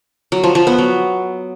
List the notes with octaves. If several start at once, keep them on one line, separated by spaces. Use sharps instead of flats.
F#3
F3
F3
B3
F#3